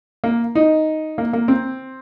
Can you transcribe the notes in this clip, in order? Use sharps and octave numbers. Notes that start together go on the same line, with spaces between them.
A#3
D#4
A#3
A#3
C4